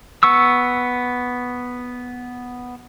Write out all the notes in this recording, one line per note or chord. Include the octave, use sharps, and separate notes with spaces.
B3 C#6 E6